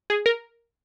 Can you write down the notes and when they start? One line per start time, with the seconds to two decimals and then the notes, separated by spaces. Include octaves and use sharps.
0.10 G#4
0.26 A#4